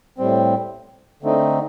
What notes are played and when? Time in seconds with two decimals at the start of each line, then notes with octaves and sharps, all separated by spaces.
0.18 A2 G3 C4
1.23 D3 A3 C4 D#4